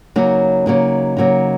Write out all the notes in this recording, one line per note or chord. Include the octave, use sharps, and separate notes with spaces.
C#3 F#3 A#3 D#4
C#3 F#3 A#3 D#4
C#3 F#3 A#3 D#4